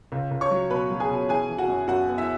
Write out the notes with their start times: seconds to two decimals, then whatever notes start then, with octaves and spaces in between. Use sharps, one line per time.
0.12 C#2
0.31 C#2
0.41 C#5 C#6
0.51 F#3
0.70 B2 B4 B5
0.91 F#3
1.00 G#4 G#5
1.09 B2
1.29 E3 G#4 G#5
1.49 E3
1.58 F#4 F#5
1.68 F#2
1.88 F#2 F#4 F#5
2.08 B3
2.18 E4 E5